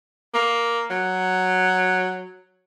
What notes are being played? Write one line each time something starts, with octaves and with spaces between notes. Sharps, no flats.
A#3
F#3